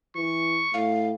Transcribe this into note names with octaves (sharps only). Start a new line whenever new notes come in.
E3 C#6
A2 F5